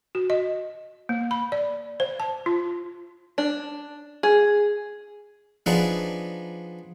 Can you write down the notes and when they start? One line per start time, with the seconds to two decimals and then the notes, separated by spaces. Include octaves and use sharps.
0.15 F#4
0.30 D#5
1.09 A#3
1.31 B5
1.52 D5
2.00 C5
2.20 A5
2.46 F4
3.38 D4
4.23 G#4
5.66 F3 B3 D4 D#4 G#4 D5